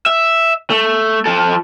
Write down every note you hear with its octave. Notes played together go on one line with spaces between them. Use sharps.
E5
A3
F3 A4